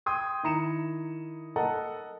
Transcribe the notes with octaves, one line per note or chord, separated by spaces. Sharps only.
G5 C6 D#6 G#6
D#3 E4 A#5 C#7 E7
A4 A#4 D#5 F#5 A5 A#5